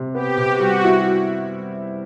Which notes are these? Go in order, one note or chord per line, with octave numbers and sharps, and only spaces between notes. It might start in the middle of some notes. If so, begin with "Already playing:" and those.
Already playing: C3
B3 G4
C3
F#4
G3
E4